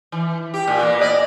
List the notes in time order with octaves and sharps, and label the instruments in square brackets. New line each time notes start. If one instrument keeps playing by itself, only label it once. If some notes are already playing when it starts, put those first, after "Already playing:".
[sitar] E3
G4
A#2
A#3 B3
D5 D#5